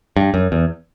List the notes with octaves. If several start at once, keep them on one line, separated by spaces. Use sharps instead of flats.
G2
F#2
E2